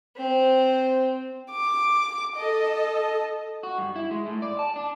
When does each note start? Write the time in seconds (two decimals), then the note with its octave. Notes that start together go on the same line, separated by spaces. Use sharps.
0.17 C4 C5
1.51 D6
2.37 A4 D#5
3.63 F#4
3.78 G2
3.96 E4
4.11 G#3
4.26 A2
4.42 D5
4.59 A5
4.76 D4